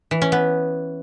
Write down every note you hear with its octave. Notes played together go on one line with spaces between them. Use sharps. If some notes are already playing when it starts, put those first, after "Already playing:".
E3
C#4
B3